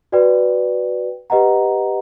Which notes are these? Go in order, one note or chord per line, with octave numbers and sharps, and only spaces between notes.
F#4 B4 D5 G5
G4 B4 D#5 F#5 A#5